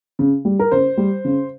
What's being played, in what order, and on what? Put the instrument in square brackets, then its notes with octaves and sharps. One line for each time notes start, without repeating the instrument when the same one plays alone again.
[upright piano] C#3
G3
A#4
C#3 C5
G3
C#3